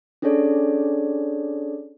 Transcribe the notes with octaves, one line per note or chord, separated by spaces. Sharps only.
C#4 D4 G#4 A4 C#5 D5